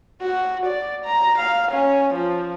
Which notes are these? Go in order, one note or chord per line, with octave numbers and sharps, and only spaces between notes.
F#4
D5
A#5
F5
C#4
F3